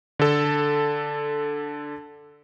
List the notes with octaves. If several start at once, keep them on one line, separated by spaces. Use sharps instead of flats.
D3 A4